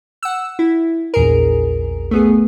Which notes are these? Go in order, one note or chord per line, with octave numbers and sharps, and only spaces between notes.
F#5 E6
E4
A#1 E2 G#4 A#4
A3 B3 G#4